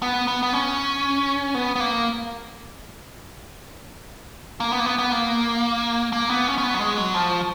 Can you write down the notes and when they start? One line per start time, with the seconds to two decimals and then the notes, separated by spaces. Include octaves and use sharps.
0.02 B3
0.28 B3
0.43 B3
0.53 C#4
1.55 B3
1.76 B3
1.80 A#3
4.60 A#3
4.73 B3
4.80 A#3
4.86 B3
4.98 B3
5.12 A#3
6.13 A#3
6.30 B3
6.47 C#4
6.58 C#4
6.63 B3
6.74 F#3
6.81 G#3
6.98 F#3
7.14 F3